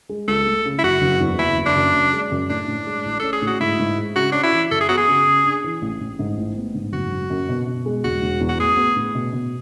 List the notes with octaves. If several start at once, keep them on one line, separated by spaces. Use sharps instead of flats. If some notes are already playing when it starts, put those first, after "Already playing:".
G#3
C#2 A4
A3
C#3
E4
F#1 F#4
F#1
E2
F#1 E4
F#1
D4
F#2
F#1
G#3
F#2
A2 D4
A2
G#3
A1
C#4 A4
G#4
A2 F#4
G#2 E4
G#2
G#3
C#3 F#4
C#4 D4
E4
E3
F#2 A4
G#4
B3 F#4
G#4
C#3
C#3
D4
E3
A1
A1
G#2
A1
B3
G#2
F#1 F#4
F#1
F#2
B2
B2
G#3
E1 F#4
E1
E2
F#4
A1 G#4
B3
A2
B2
B2